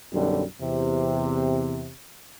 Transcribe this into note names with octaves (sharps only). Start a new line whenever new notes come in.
B1 F#2 D3 G3
E2 C3